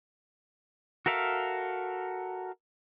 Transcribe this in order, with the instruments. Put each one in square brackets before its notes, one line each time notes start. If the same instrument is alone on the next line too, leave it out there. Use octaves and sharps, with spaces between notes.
[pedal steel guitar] F#4 A4 A#4 E5 F5